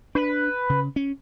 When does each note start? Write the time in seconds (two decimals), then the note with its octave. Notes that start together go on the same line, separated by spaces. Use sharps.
0.15 D4 B4
0.70 C#3
0.96 C#4